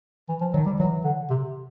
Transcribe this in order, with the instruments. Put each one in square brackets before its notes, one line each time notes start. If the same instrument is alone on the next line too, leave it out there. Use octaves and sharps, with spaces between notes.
[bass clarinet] E3
F3
[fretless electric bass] D#3 [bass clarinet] F#3
[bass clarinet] G3
[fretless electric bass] E3 [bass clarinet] F#3
[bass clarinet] D3
C3